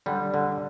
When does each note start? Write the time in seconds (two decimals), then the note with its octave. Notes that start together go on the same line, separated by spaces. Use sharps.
0.06 D3 G3
0.34 D3